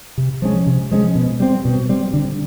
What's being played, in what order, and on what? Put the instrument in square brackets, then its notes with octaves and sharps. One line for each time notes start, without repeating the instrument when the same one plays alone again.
[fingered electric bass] C3
F3 G#3 C#4
C3
F3 G#3 C#4
B2
G3 C4
B2
G3 C4
D3